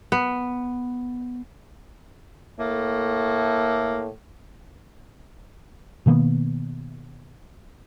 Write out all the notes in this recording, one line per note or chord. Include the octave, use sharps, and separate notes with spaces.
B3
A2 A3 A#3
B2 D#3 A#3 B3